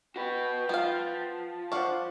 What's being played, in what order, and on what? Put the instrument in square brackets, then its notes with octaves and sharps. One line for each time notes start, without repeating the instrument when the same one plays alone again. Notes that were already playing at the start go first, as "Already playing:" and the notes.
[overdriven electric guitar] F#4 B4 [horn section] G5
[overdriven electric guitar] F3 [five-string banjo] B3 F5
[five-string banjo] D4 F5 [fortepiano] C5 F#5 C#6